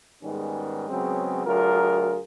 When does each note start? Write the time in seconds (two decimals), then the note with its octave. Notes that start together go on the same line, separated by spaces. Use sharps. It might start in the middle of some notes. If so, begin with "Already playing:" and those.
0.23 G#2 D#3 G3 G#3 B3 C#4
0.90 C#3 F#3 G#3 B3 C4
1.46 D2 F#3 F4 G#4 A#4